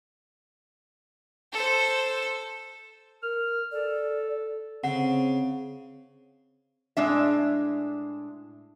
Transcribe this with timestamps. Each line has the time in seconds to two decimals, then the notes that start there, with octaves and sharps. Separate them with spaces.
1.53 A4 C5
3.23 A#4 F6
3.72 A4 D5
4.84 C#3 C4 F#5
6.97 A2 G#3 D4 E5